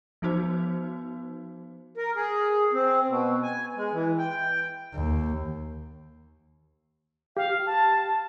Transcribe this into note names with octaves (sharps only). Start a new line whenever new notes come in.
F3 B3 D#4 F#4 C5
A#4
G#4
C4
B2
G#5
G#3
E3
G5
D#2
G4 F5
A5